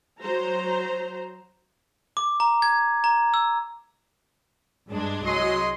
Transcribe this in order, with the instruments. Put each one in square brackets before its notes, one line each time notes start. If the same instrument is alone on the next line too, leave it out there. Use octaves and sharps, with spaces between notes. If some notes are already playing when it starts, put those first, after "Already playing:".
[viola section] F#3 C5 A#5
[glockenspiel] D6
A#5
G#6
A#5
E6
[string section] G2 G#3 D4
[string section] C2 F#3 D#5 [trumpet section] G#3 C6